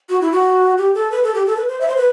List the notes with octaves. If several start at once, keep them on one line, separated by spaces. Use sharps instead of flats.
F#4
E4
F#4
G4
A4
B4
A4
G4
A4
B4
C5
E5
C5
B4